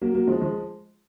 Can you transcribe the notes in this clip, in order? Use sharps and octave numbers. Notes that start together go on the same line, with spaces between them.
F#3 A#3
F#3 A#3
F3 G#3
F3 G#3